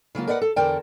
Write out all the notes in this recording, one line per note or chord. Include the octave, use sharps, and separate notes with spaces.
C#3 F#3 A#3 F4
A#4 B4 D5 D#5 F5 F#5
A4
E2 D3 A#4 D5 G5 A5